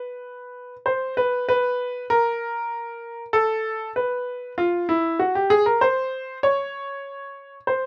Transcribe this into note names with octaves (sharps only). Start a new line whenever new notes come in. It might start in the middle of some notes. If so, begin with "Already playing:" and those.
Already playing: B4
C5
B4
B4
A#4
A4
B4
F4
E4
F#4
G4
G#4
A#4
C5
C#5
C5